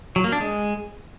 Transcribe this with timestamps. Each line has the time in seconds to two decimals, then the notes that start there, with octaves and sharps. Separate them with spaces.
0.16 F#3
0.24 A#3
0.32 D4
0.41 G#3